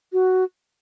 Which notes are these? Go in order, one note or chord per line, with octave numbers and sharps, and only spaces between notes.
F#4